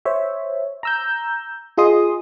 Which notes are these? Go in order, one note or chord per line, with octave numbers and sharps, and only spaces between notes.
C5 C#5 E5
A#5 E6 G6
F4 G#4 D#5 C6 D#6